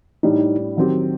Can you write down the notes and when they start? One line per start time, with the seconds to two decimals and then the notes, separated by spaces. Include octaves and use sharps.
0.23 A2 G3 D4 D#4
0.77 D#3 F#3 C4 G4